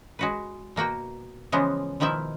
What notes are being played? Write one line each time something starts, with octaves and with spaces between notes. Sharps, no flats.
G#3 F#4 B4
B2 A#3 F#4 G5
C#3 E3 F3 G#3 B3
B2 D#3 F3 E4 E5